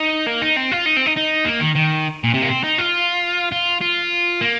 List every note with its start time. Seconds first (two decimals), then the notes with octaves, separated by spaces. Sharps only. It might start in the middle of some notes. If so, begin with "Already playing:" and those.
Already playing: D#4
0.27 A#3
0.42 D#4
0.57 C4
0.71 F4
0.86 D#4
0.96 C4
1.06 D#4
1.16 D#4
1.45 A#3
1.60 D#3
1.75 D#3
2.24 A#2
2.34 C3
2.42 A#3
2.49 C4
2.64 D#4
2.78 F4
3.52 F4
3.81 F4
4.41 A#3